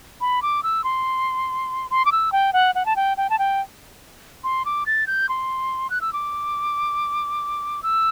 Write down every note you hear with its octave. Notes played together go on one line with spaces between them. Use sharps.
B5
D6
E6
C6
C6
D6
E6
G5
F#5
F#5
A5
G5
G5
A5
G5
C6
D6
A6
G6
C6
F#6
E6
D6
E6